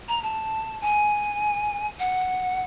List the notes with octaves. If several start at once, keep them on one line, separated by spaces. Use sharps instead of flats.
A#5
A5
G#5
F#5